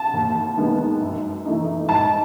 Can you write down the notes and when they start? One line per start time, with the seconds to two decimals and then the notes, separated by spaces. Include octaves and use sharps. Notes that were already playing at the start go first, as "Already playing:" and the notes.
Already playing: A5
0.13 D#2
0.57 D#3 G#3 B3
1.01 F#2
1.45 E3 A3 D#4
1.88 G#2 A5